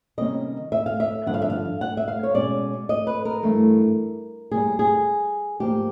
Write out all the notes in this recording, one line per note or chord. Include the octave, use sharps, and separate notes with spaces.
C3 D#3 G3 A#3 C#4 D#5
E5
F5
E5
G2 D3 F3 D4 F#5
F5
E5
F5
F#5
E5
F5
C#5
B2 G#3 C#4 D5
D#5
B4
A#4
G2 E3 A3 D4
D#2 D#3 G3 G#4
G#4
G#2 F3 A#3 D4 G4